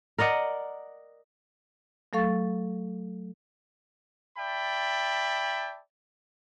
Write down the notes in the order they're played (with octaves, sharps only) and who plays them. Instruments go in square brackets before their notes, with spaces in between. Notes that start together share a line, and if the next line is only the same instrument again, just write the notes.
[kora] A#4 D5 D#5 F#5
[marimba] F#3 A3 A4 F5 C#6 A6
[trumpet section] D5 E5 G5 A5 B5